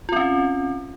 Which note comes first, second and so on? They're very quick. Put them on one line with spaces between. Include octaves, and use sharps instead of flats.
F4 C4 C#4